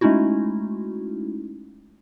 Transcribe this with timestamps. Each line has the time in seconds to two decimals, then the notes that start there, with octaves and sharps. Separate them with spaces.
0.01 G#3 A3 C#4 D#4 E4 F#4